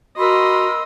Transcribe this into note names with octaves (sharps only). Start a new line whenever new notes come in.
F#4 A#4 D#5 B5 C6 E6